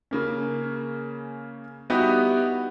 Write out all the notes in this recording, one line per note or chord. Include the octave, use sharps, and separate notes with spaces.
C#3 A#3 C#4
G3 B3 D#4 E4 F#4 G4